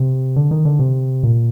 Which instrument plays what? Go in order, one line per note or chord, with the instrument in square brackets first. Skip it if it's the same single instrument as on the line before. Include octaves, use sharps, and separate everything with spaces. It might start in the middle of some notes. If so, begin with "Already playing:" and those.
Already playing: [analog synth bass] C3
D3
D#3
D3
C3
A#2